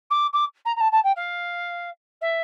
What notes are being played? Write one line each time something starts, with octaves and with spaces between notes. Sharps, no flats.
D6
D6
A#5
A#5
A5
A5
G5
F5
E5